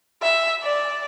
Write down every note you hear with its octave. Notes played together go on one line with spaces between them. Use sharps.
E5
D5